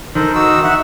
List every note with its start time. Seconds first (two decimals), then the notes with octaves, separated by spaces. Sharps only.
0.15 D#3 A4 A#4 C5
0.35 D#4 F#4 E6
0.64 E5 F#5